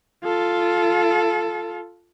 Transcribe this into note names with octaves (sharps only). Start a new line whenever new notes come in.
F4 A4